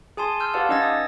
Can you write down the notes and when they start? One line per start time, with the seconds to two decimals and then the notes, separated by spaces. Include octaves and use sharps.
0.17 G#4 G#5 A5 C6
0.40 C6 E6 F6 G6
0.54 G4 B4 D5 F5 F#5 A5
0.69 C#4 D#4 D#5 E6 G#6 A6
0.82 D#6